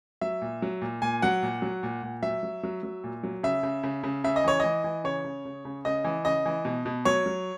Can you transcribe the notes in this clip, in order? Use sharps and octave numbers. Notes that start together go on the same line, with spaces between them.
F#3 E5
A#2
F#3
A#2
A#2 G#5
F#3 F#5
A#2
F#3
A#2
A#2
F#3 E5
F#3
F#3
F#3
A#2
F#3
C#3 E5
C#3
C#3
C#3
C#3 E5
D#5
E3 C#5
E3 D#5
E3
C#3 C#5
C#3
C#3
C#3
C#3 D#5
E3
C#3 D#5
E3
B2
B2
F#3 C#5
F#3